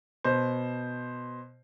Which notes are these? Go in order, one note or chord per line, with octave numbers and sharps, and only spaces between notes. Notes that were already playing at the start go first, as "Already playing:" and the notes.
B2 C5